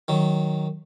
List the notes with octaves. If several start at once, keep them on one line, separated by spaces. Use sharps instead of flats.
D#3 F#3